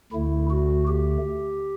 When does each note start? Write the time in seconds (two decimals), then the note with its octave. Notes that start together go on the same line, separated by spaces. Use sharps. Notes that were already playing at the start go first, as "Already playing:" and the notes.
0.12 D2 D3 A3 E4
0.50 F#4
0.87 G4